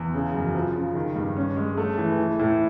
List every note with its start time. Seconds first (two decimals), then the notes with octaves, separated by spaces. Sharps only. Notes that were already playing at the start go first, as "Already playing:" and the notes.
Already playing: E2
0.14 C#3
0.34 F#2
0.55 F3
0.76 C#3
0.95 D#3
1.16 G2
1.37 C#4
1.57 G#3
1.77 A3
1.98 E3
2.18 E3
2.39 A2